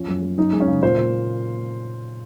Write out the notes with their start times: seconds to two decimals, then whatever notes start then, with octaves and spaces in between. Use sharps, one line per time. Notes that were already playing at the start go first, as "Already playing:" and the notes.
Already playing: F3 C#4
0.08 F#2
0.22 F#2
0.38 F#2 D#4
0.53 G#3
0.60 C#4
0.67 C#3
0.83 A#2 C5
0.97 A#2